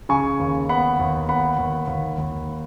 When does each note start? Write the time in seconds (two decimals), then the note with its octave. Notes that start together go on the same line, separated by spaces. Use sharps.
0.09 C#3 G#5 C#6
0.40 D#2
0.69 B3 F#5 B5
1.00 D#2
1.29 B3 F#5 B5
1.59 D#2
1.88 D#2
2.18 D#2